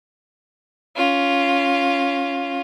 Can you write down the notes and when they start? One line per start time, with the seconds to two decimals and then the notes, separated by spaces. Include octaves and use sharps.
0.96 C#4 F4